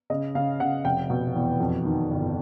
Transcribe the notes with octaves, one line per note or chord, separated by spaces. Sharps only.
C#3 D#5
C#3 F5
C#3 F#5
F1 G5
B2
E2
F2
D#3
G1